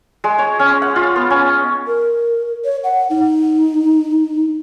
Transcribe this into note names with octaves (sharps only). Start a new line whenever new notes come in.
G#3
C#5
C#4
F#5
F4
B3
C#4
A#4
C#5
F#5
D#4